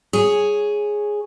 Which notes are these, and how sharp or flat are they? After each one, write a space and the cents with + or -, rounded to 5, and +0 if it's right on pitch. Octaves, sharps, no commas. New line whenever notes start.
G#4 +0 C#5 +0